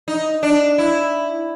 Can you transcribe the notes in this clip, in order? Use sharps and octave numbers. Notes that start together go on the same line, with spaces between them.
D#4
D4
E4